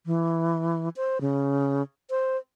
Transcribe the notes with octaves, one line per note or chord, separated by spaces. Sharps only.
E3
C5
C#3
C5